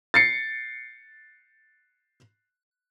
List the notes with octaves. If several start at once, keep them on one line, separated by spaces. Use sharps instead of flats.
A6 C7 C#7